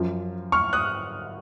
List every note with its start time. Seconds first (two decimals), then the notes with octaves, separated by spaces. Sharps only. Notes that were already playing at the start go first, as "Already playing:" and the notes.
Already playing: F#2 F3
0.52 C#6 F6
0.73 D#6 F#6